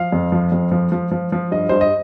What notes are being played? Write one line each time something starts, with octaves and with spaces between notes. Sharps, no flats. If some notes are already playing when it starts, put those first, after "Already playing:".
Already playing: F3 F5
F2
F3
F2
F3
F3
F3
F3
G2 D#5
G2 C5
D#5